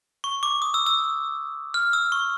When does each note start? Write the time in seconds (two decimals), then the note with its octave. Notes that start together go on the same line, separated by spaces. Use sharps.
0.24 C#6
0.43 D6
0.62 D#6
0.74 E6
0.86 E6
1.74 F6
1.93 E6
2.12 C#6